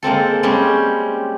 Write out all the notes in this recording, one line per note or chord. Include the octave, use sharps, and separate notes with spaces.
G#3 A#3 C4 A4
G3 G#3 C4 C#4 G4